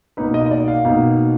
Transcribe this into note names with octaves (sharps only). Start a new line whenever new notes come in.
B2 A#3 D#4 B4
D#5
D#5
D5
F5
B2 A#3 D#4